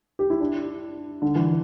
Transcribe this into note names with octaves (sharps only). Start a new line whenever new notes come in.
G4
E4
D4
D3
E3